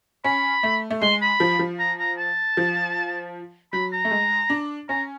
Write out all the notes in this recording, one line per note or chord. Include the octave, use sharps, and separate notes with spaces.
C#4 B5
A3
A3
G#3 C6
B5
F3
F3
A#5
A#5
A5
F3
F#3 B5
A#5
A3
G#3
D4
C#4 A#5